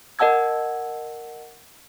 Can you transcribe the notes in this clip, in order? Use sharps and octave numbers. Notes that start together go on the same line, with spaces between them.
A#4 D#5 F#5 A5 E6 G#6